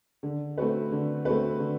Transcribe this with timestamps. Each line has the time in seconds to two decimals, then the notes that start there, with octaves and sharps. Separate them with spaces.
0.23 D3
0.58 A3 C4 F#4 B4
0.92 D3
1.25 A3 C4 F#4 B4
1.59 D3